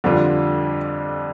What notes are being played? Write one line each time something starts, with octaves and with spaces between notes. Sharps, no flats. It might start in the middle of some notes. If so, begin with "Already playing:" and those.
F2 D3 G3 D4 F4